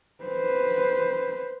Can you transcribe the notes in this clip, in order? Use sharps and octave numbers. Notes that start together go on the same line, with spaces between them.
B4 C5